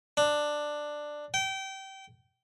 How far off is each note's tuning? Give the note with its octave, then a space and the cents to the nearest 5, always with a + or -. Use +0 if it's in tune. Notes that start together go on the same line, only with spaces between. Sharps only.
D4 +10
G5 -25